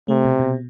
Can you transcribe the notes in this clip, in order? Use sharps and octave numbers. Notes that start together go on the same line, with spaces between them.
C3 A3
B2
B2